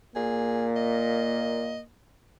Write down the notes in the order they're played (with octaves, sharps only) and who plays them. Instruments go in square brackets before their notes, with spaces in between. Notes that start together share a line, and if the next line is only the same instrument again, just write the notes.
[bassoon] A#2 [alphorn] A#3 [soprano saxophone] G#4
[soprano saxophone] D#5